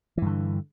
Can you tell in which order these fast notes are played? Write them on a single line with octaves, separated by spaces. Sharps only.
E3 G2 D3